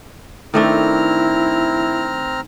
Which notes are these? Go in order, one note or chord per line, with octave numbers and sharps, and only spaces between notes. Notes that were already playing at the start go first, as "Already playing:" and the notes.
D#3 A3 C4 D4 E4 A#5 F6